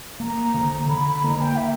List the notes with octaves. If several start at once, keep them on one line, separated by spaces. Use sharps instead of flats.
A#3 A#5
D3
D3 B5
B5
A#3 A#5
G5
E5